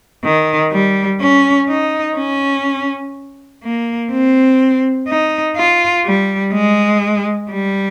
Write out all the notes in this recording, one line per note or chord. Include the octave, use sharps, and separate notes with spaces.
D#3
G3
C#4
D#4
C#4
A#3
C4
D#4
F4
G3
G#3
G3